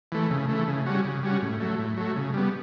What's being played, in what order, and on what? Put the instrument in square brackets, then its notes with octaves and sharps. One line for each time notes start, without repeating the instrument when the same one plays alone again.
[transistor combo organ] E3 A3
C#3
E3 A3
C#3
G3 C#4 F#4
C#3
G3 C#4 F#4
A2
F#3 A3
A2
F#3 A3
C#3
G3 B3